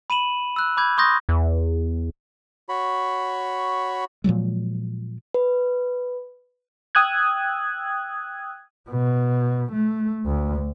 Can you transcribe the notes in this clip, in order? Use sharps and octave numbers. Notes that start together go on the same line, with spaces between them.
B5 D#7 E7 F#7
E6 F#6
B5 D6 G6 G#6
C6 C#6 D#6 G6 A#6
E2
F#4 C#5 B5
A#2 F3 F#3 G#3
B4
G5 D#6 E6 F#6 G#6
B2
A3
D2